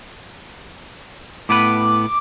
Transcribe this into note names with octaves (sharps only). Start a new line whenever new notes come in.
A2 B3 B4 D6